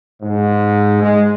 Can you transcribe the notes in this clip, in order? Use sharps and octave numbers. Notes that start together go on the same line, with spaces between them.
G#2
G#3